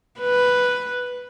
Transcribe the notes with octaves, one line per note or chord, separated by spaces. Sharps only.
B4